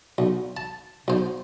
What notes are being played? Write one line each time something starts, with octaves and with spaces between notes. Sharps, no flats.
B1
A5
B1 C5